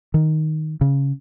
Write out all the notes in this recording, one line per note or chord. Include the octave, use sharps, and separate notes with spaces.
D#3
C#3